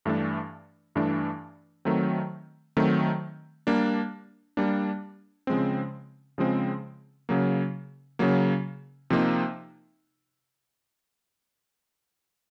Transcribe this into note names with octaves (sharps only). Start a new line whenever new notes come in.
G2 E3 A3 D4
G2 E3 A3 D4
D#3 F#3 A3 C4
D#3 F#3 A3 C4
G3 A#3 D4
G3 A#3 D4
C#3 F3 G#3 C4
C#3 F3 G#3 C4
C#3 F#3 A#3
C#3 F#3 A#3
C3 F3 A#3 D#4